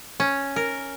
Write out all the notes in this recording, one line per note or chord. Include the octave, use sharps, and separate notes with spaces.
C#4
A#4